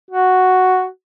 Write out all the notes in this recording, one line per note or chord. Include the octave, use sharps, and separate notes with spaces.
F#4